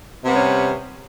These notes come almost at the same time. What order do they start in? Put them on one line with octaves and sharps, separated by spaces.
C3 B3 G3 C#4